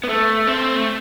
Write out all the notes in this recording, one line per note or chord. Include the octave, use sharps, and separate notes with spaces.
B3
A3
C4
A3